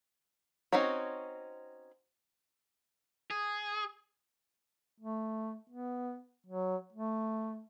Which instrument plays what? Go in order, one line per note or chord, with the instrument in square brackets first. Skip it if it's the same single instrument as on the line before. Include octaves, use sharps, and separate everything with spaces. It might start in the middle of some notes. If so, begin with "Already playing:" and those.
[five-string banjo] C4 C#4 D#4 F#4 C#5
[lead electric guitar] G#4
[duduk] A3
B3
F#3
A3